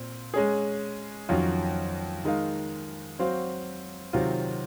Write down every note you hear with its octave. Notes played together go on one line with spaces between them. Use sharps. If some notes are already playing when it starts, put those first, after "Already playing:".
Already playing: A#2 C4
G#3 C#4 G#4
F2 D#3 F#3 C#4 F4
D#3 G#3 D#4 A#4 F5
F#3 C4 F#4 C5 F5
C3 D#3 F#3 C4 F4